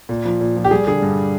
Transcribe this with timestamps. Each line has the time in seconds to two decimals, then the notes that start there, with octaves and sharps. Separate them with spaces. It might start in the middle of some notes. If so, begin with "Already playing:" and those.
0.09 A#2
0.25 F3
0.41 A#2
0.56 F3
0.64 G4
0.71 G3 G#4
0.87 D3 G#4
1.02 G2